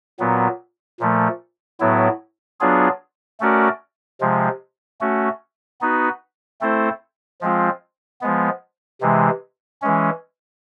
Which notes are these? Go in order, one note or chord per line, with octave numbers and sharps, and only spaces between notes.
A#2 F#3 B3
A#2 F3 A3
A2 F#3 B3 E4
F#3 B3 D4 F4 G#4
A3 C#4 F#4 A#4 D5
C3 F3 G#3
A3 C#4 F#4
B3 D#4 F#4 B4
A3 C4 E4 A4 C5
F3 G#3 C4 F4
F3 G#3 B3
C3 E3 G#3
E3 G#3 C#4